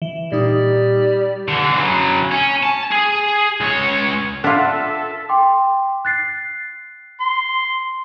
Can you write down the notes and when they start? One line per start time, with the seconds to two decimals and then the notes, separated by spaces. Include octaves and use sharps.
0.02 E3
0.32 A#2 G3 D#4
1.48 D3 E3
1.77 C#3 F#3
2.32 C#4
2.63 A5
2.91 G#4
3.60 C#2 C#5
4.44 D4 F4 A4 E5 F#5
5.29 G5 C6 D6
6.05 F#6 A6 C7
7.20 C6